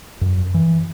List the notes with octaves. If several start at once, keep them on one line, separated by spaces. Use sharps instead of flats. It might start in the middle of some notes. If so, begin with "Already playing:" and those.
F#2
E3